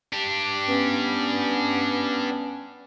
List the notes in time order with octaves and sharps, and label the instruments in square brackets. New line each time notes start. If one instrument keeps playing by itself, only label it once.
[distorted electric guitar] D4 G4
[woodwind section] B3 C#4